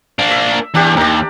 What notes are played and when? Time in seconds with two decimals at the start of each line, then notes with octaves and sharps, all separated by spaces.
0.19 A#3 D4
0.31 E5
0.75 E2 D4 G4
0.97 D#2 D5 A#5